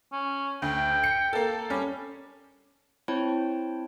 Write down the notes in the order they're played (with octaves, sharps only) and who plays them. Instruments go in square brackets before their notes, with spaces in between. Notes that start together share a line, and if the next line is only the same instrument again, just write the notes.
[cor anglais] C#4
[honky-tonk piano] D2 [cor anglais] G5
[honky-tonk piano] C#7
A#3 A4
[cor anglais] G3 [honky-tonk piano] C#4
[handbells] C4 E4 C5 C#5 G5 A5